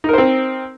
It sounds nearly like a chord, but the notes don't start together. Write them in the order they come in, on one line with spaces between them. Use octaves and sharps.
D#4 A#4 C5 C4